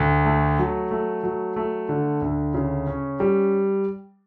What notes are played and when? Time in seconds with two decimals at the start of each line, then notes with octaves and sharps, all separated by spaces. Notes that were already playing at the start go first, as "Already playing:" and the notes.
Already playing: D2
0.26 A3
0.59 F#3
0.91 A3
1.23 F#3
1.56 A3
1.89 D3
2.22 D2
2.54 C#3
2.87 C#4
3.20 G3